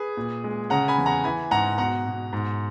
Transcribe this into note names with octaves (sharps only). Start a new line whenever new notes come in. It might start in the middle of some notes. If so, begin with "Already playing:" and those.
Already playing: G#4 B4
A#2
G#3
C#3 F#5 A#5
G#5 B5
E2
F#5 A#5
E3 G#5 B5
G#2 F#5 A#5
B2 F#5 A#5
B2
G#2